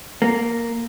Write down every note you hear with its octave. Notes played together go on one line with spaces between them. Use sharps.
A#3